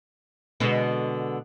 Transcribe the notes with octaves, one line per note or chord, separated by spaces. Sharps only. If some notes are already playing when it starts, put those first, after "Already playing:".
B2 D3 G#3